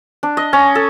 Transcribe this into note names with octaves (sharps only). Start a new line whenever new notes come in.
D4
D#5
C#4
A4